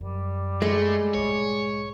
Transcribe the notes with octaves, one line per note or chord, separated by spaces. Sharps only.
F#2 G3
G#3 A3
B1 G#2 C#5